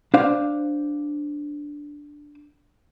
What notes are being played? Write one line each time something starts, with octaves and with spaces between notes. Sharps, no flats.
D4 C5 F5